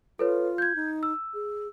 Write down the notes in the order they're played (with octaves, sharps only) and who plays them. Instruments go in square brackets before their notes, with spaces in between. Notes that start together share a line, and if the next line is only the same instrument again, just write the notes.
[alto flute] F4 [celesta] A4 B4 C#5
[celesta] G6 G#6
[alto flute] D#4
[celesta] E6
[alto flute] G#4